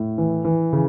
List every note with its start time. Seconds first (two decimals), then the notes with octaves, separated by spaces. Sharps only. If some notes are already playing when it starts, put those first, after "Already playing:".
Already playing: A2
0.18 E3
0.45 E3
0.73 C#3